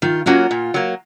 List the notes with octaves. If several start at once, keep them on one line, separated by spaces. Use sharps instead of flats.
D#3 F4
F#3 A#3 C#4 F4 F#4
A#2
F#3 A#3